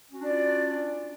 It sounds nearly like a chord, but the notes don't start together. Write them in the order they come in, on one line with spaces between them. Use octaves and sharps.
C#4 F#4 D4 D5 F4